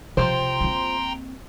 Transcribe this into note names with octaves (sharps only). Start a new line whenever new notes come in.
C3 F3 F#3 C5 G5 A#5 C6
A#3 C4